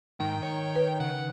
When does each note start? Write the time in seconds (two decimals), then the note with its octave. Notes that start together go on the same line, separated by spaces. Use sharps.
0.20 G#2 D#3 G5
0.43 C#5
0.76 B4
1.00 C#3 F#5